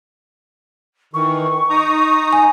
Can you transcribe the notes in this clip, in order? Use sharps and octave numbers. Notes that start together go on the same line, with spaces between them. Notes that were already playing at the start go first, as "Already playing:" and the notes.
D#3 E3 C#6
D#4 A#5 D#6
G#5